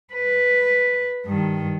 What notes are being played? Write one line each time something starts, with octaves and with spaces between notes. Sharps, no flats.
B4
G2 D#3